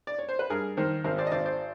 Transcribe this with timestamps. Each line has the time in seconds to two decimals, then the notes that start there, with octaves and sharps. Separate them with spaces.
0.07 D5
0.19 C#5
0.29 C5
0.39 B4
0.50 G2 G#4 A#4
0.77 D#3 A#4 C5
1.04 G#1 A#4 C5
1.18 C5 D5
1.27 D#5
1.32 G#1 C5 D5
1.45 C5 D5